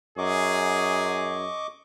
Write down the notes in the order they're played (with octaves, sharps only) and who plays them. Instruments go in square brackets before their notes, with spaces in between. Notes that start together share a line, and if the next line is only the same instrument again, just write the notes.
[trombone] F#2 [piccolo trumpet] G#4 [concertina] D#5 C#6 D6